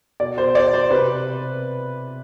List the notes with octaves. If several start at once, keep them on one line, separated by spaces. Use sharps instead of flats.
B2 D5
C5
D5
C5
C3 B4